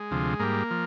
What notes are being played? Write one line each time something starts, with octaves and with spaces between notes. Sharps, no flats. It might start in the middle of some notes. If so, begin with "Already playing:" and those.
Already playing: G#3
D2 C3 F3
G#2 G3 A#3
F3